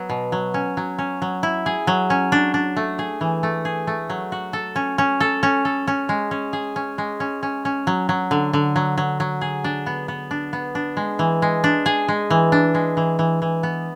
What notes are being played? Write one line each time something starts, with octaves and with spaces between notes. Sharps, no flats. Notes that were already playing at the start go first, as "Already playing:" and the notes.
Already playing: F#3 B3
B2
F#3
C#4
F#3
C#4
F#3
E4
G#4
F#3
C#4
D4
D4
A3
G#4
E3
A3
G#4
A3
F#3
F#4
A4
C#4
C#4
A4
C#4
A4
C#4
G#3
C#4
G#4
C#4
G#3
C#4
C#4
C#4
F#3
F#3
D3
D3
F#3
F#3
F#3
G#4
D4
B3
B3
D4
B3
D4
G#3
E3
G#3
D4
G#4
G#3
E3
D4
G#3
E3
E3
E3
B3